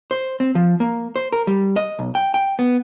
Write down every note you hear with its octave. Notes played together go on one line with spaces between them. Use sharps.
C5
C4
F3
A#3
C5
A#4
G3
D#5
B1
G5
G5
B3